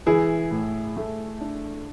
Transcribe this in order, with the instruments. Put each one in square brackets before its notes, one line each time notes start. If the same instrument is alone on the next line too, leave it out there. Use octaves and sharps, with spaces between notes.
[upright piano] E3 [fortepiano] E4 G#4
[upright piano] A2
A3
D4